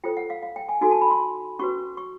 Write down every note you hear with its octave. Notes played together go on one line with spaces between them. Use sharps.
F4 A4 C5 G5
F#5
F5
F5
G5
G#5
D#4 F#4 A4 G#5
A5
B5
C6
C#4 F#4 B4 C#6
C#6